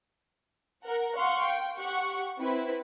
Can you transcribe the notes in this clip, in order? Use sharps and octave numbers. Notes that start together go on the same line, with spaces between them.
A#4 F#5
F5 F#5 C6 C#6
G5
G4 F#5 C#6
C4 E4 B4